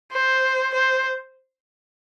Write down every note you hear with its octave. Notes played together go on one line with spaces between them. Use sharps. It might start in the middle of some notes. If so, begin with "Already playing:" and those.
C5
C5